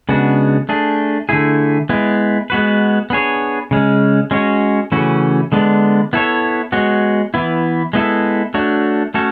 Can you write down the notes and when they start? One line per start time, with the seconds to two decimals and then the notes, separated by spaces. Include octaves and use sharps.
0.09 C#3 G#3 B3 D4 F#4
0.69 A3 D4 G#4
1.29 D3 A3 E4 G#4
1.89 G#3 B3 E4
2.50 G#3 B3 F#4 B4
3.10 B3 D4 G#4 C#5
3.71 C#3 G#3 C#4
4.31 G#3 C#4 F#4 C#5
4.92 C#3 E3 A3 C#4 F#4
5.52 D3 G#3 B3 D4
6.13 B3 E4 A4 C#5
6.72 G#3 B3 F#4 C#5
7.34 E3 B3 E4
7.93 G#3 B3 E4 A4
8.54 A3 D4 F#4 C#5
9.14 A3 C#4 F#4 A4 C#5